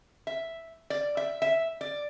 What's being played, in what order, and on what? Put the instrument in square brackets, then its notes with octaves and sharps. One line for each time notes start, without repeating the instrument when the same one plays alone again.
[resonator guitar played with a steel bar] E5
D5
E5
E5
D5